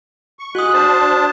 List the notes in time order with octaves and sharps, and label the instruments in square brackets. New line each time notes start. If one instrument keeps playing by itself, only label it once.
[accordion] C#6
[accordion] G#3 F#6 [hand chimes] F#4 D#6
[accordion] D4 C5 A5